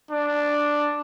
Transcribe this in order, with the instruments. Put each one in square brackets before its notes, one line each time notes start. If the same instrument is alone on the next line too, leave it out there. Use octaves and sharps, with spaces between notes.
[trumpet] D4